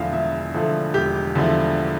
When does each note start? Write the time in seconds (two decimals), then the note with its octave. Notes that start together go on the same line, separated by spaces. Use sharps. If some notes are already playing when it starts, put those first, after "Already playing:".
Already playing: E1 E2 D3 F3 A3 E5 F5
0.12 E1 E5
0.54 E2 D3 F3 A3
0.94 E1 G4
1.35 E2 D3 F3 A3